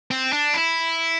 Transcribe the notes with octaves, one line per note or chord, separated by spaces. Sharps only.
C4
D4
E4